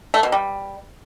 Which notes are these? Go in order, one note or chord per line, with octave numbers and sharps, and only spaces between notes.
A3
B2
G3